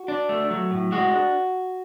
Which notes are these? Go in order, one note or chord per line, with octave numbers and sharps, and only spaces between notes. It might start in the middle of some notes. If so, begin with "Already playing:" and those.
Already playing: F#4
D4
A3
F#3
A2
G#3 F#4
D4